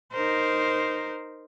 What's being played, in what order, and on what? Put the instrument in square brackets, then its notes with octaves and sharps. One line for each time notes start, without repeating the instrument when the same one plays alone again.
[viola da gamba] D#4 A#4 C5